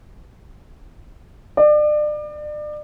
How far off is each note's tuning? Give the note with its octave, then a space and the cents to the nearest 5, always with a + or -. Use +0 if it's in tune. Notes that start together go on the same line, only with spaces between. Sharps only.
D5 +35